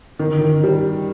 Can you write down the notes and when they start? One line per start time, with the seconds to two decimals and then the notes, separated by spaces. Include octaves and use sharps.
0.19 D#3
0.41 D#3
0.64 G3